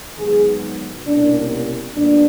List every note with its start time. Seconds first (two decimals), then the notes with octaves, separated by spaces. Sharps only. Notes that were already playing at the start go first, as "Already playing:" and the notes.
0.17 G#2 D#3 F#3 B3 G#4
1.06 C2 B2 G3 A#3 C#4 D4
1.95 A#2 G3 B3 D4